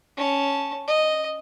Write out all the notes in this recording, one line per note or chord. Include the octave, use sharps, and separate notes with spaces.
C#4 A5
D#5